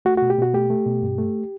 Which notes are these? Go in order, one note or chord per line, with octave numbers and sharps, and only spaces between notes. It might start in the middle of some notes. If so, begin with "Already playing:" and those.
A3 F#4
B2 F#4
G4
B2 F#4
A3 G4
A3
B2
G2
A3